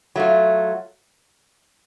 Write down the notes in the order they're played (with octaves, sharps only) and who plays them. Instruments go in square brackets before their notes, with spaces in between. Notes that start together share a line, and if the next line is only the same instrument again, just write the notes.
[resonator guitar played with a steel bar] F#3 A3 F4